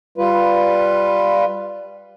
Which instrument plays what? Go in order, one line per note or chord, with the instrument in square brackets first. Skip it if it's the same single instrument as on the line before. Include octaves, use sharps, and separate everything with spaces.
[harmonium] G3 F4 B4